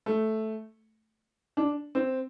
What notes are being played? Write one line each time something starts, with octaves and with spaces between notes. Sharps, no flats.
A3
D4
C4